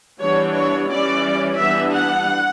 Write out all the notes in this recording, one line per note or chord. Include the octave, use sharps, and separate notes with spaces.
E3 G3 B3 D4 C#5
C#5
E3 G3 C#4 D5
E3 G3 B3 D4 E5
F#5